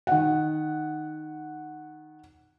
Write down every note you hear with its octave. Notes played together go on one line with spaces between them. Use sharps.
D#3 F#5